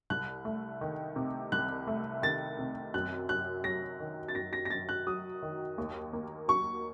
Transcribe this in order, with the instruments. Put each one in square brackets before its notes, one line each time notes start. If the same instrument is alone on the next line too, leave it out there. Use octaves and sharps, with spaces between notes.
[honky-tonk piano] C2 [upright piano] F#6
[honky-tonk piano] A3
D#3
C3
[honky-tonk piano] C2 [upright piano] F#6
[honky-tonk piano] A3
[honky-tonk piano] D#3 [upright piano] A6
[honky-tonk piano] C3
[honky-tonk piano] F#2 [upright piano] F#6
[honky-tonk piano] F#2 [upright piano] F#6
[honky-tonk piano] F#3 [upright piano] A#6
[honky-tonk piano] D#3
[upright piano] A6
[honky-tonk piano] F#2 [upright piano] A#6
[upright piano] A#6
A#6
[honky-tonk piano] F#2 [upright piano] A6
[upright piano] F#6
[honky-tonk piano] F#3 [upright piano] D#6
[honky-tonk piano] D#3
D#2
A#3
[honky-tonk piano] F#3 [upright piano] C#6